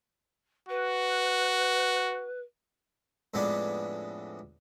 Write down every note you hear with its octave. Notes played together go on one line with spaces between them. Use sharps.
F#4 B4
F2 A2 G#3 B3 D4